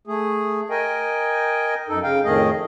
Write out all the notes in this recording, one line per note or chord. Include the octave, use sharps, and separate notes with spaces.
A3 G#4
A#4 D#5 G5 G#5
F#2 D#4 A4
C#3 F5 G5
F2 A2 D#3 A3 G#4 D#5